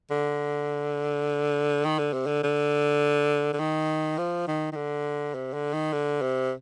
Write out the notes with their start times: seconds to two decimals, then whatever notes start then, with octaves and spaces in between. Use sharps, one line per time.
0.10 D3
1.85 D#3
1.98 D3
2.13 C3
2.26 D3
2.43 D3
3.53 D3
3.59 D#3
4.18 F3
4.47 D#3
4.72 D#3
4.76 D3
5.34 C3
5.53 D3
5.73 D#3
5.93 D3
6.21 C3